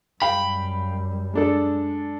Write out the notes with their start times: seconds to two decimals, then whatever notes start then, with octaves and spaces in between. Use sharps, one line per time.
0.22 F#2 G3 F5 G5 B5
1.34 G#3 D4 A4